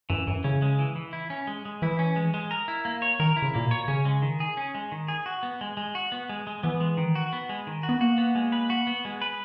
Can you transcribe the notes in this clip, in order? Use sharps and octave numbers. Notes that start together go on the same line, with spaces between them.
F#2 E3
F#2 E3
C#3 C#4
G#3
E3
E3
E4
C#4
G#3
G#3
E3 E4
C#4
G#3
G#3
A#4
E4
A#3
C#5
D#3 A#4
E4
C#3
A#2 A#3
B2
C#5
C#3 C#4
G#3
D#3
G#4
C#4
G#3
D#3
G#4
F#4
B3
G#3
G#3
F#4
B3
G#3
G#3
E3 B3
G#3
D#3
F#4
B3
G#3
D#3
F#4
B3
A#3 F#4
B3
G#3
B4
F#4
B3
G#3
B4